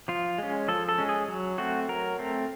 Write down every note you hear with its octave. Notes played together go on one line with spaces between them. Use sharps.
F3 F4
G#3 C#4
F3 A4
A4
G#3 C#4
G#4
F#3
A3 C4 F#4
F#3 A#4
A3 C4